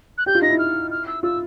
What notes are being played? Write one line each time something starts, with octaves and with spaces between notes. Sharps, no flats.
F#6
G4 G6
F4
D#4 A#6
E4
F6
F6
E6
F4 E6